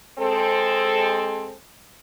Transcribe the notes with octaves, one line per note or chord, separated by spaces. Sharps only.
G#3 C4 A4